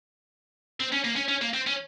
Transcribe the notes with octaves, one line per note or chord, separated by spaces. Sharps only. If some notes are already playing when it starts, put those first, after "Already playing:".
C4
C#4
A#3
C#4
C#4
A#3
C4
C#4